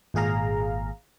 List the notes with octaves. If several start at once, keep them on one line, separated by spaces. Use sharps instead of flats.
G#1 A#2 G#4 F5 A#5